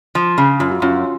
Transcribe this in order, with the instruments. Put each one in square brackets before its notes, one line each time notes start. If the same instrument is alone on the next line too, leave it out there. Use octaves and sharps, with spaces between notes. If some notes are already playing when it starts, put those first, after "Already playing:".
[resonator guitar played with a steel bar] F3
C#3
[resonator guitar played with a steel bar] F#2 [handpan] F4
[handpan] F#4
[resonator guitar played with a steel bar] F#2 [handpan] C#4 F4